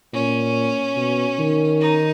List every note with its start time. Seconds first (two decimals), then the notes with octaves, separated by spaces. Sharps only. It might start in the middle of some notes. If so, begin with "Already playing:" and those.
0.13 A#2 C#4
0.96 B2
1.39 D#3
1.80 D#4